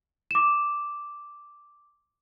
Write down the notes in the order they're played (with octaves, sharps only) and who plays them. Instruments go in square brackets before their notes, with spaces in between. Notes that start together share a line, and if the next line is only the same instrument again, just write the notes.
[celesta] D6 E7